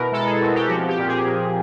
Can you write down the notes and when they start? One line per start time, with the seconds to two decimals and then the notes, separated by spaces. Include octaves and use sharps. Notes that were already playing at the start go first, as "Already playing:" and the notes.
Already playing: B2 E4 A#4 B4
0.12 G#3 A4
0.26 G#4
0.41 C4 F#4
0.55 G4
0.69 F3 F#4
0.88 G4
0.98 A#2
1.08 G#4
1.27 A#2